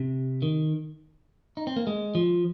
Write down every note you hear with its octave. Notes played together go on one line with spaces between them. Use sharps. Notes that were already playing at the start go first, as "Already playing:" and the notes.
Already playing: C3
D#3
D#4
C4
A#3
G#3
F3